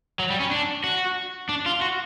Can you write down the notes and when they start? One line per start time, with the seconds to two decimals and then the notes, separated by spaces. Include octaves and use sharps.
0.19 F#3
0.30 G3
0.40 C#4
0.51 D4
0.84 F#4
1.49 D4
1.66 F4
1.81 F#4